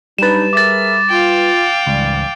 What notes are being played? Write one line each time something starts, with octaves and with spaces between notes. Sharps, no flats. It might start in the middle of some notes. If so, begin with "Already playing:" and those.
F#3 G3 D4 D#4 B4 A6 E7
G#4 A#4 E5 D6 A6
F4 F5 G5
C#2 G#2 E3 G3